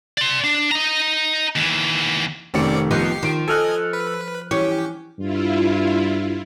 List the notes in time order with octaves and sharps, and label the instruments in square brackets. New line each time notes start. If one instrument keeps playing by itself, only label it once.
[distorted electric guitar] D5 C6
D4
D#5 A#5
D#2 E3
[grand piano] F1 D#3 C#7 [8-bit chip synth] C4 C#4 D5
[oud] F3 B3 D#4 [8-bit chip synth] G4 C7
[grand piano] D#3 D7 [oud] F3
[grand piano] A4 F6 F#6 [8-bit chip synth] D#5 G#5
[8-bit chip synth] B4
[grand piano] E3 [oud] C#4 [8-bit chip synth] G4
[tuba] G2 [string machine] E4 F4